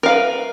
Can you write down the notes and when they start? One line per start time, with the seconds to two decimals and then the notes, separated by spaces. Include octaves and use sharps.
0.03 A#4
0.06 F5
0.08 B4